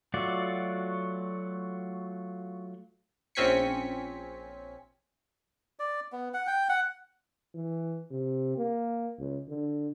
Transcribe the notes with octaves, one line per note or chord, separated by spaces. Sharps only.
F#3 A3 F4 F#4 D5
A#1 C4 C#4 G#5 B6 C#7
D5
B3
F#5
G5
F#5
E3
C3
A#3
C#2
D3